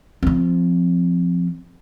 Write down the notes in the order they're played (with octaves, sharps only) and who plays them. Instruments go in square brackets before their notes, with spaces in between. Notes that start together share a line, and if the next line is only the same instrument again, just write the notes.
[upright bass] F3 C4